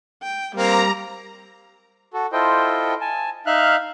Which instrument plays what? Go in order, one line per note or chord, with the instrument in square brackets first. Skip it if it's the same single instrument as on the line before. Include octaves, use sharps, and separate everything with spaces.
[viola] G5
[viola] G3 [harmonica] A#3 C4 [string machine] A#5
[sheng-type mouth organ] F#4 A4
E4 F4 A4 C5 D#5 G5
G#5 A5
D#4 E5 F5 F6 F#6